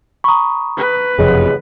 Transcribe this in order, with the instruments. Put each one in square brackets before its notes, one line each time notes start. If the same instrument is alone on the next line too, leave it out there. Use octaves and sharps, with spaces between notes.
[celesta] A#5 C#6 [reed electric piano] B5 D#6
[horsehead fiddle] B4
[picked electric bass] F#1 F2 C3 [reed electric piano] G#4 C#5 D#5